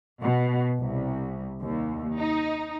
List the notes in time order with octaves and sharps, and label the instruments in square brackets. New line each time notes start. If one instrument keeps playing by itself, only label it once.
[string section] B2
C2
D#2
D#4